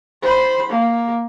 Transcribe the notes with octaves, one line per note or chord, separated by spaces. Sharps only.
C5 B5
A#3